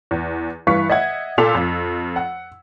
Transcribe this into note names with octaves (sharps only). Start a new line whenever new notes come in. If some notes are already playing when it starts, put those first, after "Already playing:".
E2
G2 E3 B4 F5 C#6 B6
D#5 E5 F#5 G#6
A#2 A4 E6 B6 F7
F2
F#5